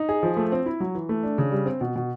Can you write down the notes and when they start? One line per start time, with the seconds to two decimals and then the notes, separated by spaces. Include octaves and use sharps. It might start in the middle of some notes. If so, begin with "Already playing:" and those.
Already playing: D#4
0.09 G#4
0.23 F3
0.37 A3
0.52 C4
0.66 E4
0.80 F#3
0.95 E3
1.09 A3
1.23 D4
1.38 C#3
1.52 G3
1.66 C4
1.81 B2
1.96 B2